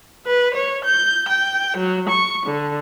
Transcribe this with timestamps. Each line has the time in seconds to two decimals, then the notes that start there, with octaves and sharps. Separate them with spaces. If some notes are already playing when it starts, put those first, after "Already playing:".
0.24 B4
0.54 C#5
0.84 G6
1.29 G5
1.77 F#3
2.09 C#6
2.45 D3